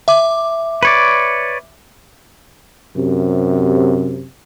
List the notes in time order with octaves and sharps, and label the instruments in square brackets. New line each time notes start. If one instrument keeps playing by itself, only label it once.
[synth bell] E5 D6
[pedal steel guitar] B4 C#5 D5
[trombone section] F#2 C3